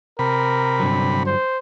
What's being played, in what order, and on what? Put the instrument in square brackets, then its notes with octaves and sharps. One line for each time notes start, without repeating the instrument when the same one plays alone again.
[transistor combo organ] C3 B5 [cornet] A#4
[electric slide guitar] G2 D3 F#3
[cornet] C5